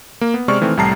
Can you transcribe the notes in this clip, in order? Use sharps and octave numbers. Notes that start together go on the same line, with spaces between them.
A#3
B3
C3 G#3 C5 D5 C#6 F6
D#3 E3 A3 C4
C2 A2 G3 A5 A#5 C7